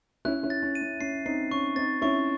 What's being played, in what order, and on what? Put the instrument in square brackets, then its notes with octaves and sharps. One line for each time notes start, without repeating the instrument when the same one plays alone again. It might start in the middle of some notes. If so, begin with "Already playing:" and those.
[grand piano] C#4 E4 [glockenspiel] F#6
[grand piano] C#4 E4
[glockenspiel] A6
[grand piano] C#4
[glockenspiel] D#7
[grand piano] C#4
[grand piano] C#4 [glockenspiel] C7
[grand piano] C4 D#4 [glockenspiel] C7
[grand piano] C#4 [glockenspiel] C#6
[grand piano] C4 D#4 [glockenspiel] A6
[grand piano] C#4 E4 [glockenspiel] C#6